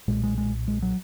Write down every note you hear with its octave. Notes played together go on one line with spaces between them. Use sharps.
B1 A#2 G#3
G#3
G#3
G#3
F#3